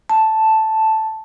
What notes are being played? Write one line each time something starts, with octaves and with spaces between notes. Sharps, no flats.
A5